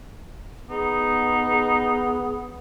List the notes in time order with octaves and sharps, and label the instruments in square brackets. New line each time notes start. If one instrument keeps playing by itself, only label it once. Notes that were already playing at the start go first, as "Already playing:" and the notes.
[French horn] B3 [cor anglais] D#4 [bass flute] G#4
[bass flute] G#4